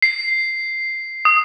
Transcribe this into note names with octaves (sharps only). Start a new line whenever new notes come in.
C7
D#6